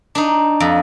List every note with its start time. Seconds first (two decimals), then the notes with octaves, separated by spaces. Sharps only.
0.15 D4 D#4
0.60 F2